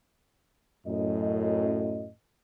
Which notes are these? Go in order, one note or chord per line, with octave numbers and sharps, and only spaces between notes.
F#2 A2 D#5